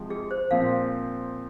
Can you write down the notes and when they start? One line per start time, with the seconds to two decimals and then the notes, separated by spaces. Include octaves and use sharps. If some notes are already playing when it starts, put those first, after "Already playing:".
Already playing: C3 F3 G#3
0.10 G#4
0.31 C5
0.51 A#2 F3 C4 F5